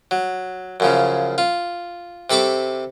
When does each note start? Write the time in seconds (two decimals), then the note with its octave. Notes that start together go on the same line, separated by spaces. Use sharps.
0.11 F#3
0.80 F#2 C#3 F3
1.38 F4
2.30 C3 A4 B5 C#6 D6